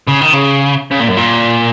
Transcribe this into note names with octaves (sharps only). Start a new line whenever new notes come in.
C#3
D#3
C#3
C#3
A#2
F#2
A#2